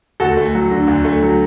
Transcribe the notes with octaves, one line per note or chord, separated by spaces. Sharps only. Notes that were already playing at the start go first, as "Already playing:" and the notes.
D2 F#4 A4
A3
F#3
D3
D2
A3
F#3